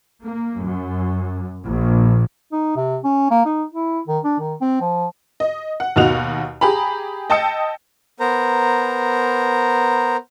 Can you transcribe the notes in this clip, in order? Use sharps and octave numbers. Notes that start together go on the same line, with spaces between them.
A#3
F#2
A#1
D#4
C3
C#4
A#3
D#4
E4
D#3
D4
D#3
C4
F3
D#5
F#5
D#2 B2 D#4 F#4 F#5 F7
G4 G#4 A#5 B5
D#5 G5 A5 D#6 E6 C#7
B3 A#4 C5 A#5